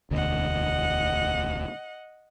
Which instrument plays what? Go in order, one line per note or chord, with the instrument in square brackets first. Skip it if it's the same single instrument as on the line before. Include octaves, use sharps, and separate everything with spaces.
[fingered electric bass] E1 D2 [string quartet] D#5 F#5